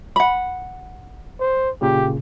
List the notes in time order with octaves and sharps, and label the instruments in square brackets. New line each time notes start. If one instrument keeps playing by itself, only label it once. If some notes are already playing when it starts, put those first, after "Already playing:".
[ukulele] F#5 B5
[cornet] C5
[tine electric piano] A#2 C#3 [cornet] G4